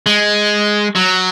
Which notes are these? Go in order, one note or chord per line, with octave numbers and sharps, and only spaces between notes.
G#3
F#3